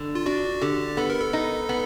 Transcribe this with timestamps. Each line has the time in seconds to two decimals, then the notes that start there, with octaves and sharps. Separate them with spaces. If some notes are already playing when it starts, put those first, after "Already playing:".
Already playing: D3
0.15 F4
0.26 D4 F#4
0.61 D3 G4
0.97 B3 A4
1.10 A#4
1.21 A4
1.33 D#4
1.69 B3